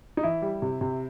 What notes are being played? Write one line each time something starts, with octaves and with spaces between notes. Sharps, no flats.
D#4
E3 E4
G3
C3
C3